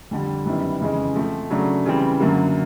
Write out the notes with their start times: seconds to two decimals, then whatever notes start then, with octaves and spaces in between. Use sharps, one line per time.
0.11 F2 D3 G3
0.46 F#2 D#3 G3 B3 E4
0.81 F2 C#3 E3 G#3
1.15 F3 A3 C4
1.50 C#3 F#3 A3 D4
1.85 C#3 E3 G3 C4
2.20 F#2 D3 F#3 A#3